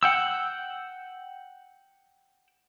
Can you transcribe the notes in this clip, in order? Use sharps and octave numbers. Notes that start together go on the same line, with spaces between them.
F#5 G5 E6